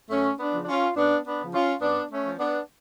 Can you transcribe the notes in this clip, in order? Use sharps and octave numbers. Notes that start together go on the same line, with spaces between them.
F#2 A3 C#4
B3 D4
C#3 F3
D4
C#4 F4
F#2 B3 D4
B3 D4
C#3 F3
C#4 F4
F#2 B3 D4
A3 C#4
F3
B3 D4